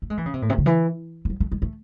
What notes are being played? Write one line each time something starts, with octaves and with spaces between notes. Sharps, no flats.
A3
G#3
E3
C#3
C3
A2
C3
C#3
E3
E3
F#3
A3
G#3
A3